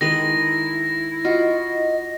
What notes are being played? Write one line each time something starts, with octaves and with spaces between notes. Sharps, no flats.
D#3 G#3 E4 B4 A#6
F4 F#4 D#5